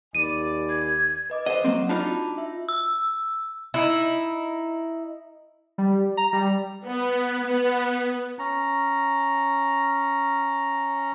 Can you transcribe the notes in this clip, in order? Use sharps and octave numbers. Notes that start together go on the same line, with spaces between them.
D#2 D5 G#5 B5 D#7
G#6
B4 D#5 D6
C5 D#5 F#5
F#3 A#3 C4
D4 D#4 F4 A5 B5 D6
F#4
E5
E6
D#4 E4
G3
A#5
G3
B3
B3
C#4 A#5